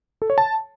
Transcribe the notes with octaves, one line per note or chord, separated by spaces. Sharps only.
A4
C#5
A5